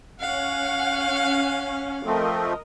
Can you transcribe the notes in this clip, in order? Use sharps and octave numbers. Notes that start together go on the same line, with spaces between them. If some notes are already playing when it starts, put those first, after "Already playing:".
C#4 F5 F#5
F3 A3 C4 A#4 D#5